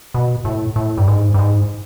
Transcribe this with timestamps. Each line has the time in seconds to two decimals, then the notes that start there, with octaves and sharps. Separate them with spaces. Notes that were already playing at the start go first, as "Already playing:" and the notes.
0.14 B2
0.45 A2
0.76 A2
0.98 G2
1.08 G#2
1.34 G2
1.39 G#2